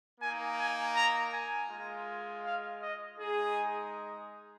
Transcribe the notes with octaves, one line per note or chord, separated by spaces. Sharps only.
A#3 D#4 G#5
G#5
A#5
G#5
G#3 F4
F5
D#5
G#3 D#4 G#4